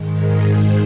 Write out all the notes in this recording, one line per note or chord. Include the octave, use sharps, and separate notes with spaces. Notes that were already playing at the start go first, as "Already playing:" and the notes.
Already playing: G#2 D#3 G#3
A#4
C5